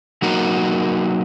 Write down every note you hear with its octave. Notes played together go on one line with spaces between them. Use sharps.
F#3 A#3 D#4 F#4 A#4